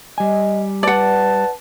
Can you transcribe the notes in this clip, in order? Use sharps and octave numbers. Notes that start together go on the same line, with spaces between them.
G3 D#5 G#5
B4 D5 F#5 A5